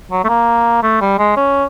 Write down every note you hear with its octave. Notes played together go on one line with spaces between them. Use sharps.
F#3
A3
A#3
A3
G3
G#3
C#4